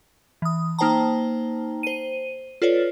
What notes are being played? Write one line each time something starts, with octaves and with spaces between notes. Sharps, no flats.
E3 D#6
A#3 D#4 C5 G5 A5 A#5
C5 D#7
F4 A4 B4 C#5 D5